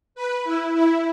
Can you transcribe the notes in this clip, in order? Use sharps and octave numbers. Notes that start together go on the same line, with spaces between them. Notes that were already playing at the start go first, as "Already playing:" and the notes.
B4
E4
E4